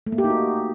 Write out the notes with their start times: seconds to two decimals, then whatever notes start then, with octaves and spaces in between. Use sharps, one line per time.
0.07 A3
0.12 A#3
0.18 G4
0.24 D#4
0.30 F#4